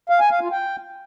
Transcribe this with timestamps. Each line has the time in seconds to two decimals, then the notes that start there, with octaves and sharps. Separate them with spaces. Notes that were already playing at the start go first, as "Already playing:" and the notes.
0.09 F5
0.20 G#5
0.31 F5
0.41 F4
0.52 G5